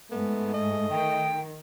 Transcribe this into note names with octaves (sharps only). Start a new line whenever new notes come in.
G#2 A3 B3
D#5
D#3 G5